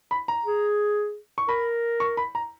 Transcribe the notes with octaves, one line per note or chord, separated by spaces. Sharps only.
B5
A#5
G#4
C#6
A#4 B5
C#6
B5
A#5